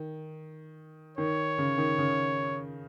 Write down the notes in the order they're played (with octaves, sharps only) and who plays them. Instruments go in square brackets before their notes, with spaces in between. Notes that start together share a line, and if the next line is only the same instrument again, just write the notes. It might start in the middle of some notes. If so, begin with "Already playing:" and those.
Already playing: [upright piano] D#3
[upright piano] D#3 [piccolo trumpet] C#5
[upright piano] C#3
D#3
C#3